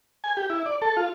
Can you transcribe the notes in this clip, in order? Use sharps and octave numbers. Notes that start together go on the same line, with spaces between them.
G#5
G4
E4
D5
A4
F4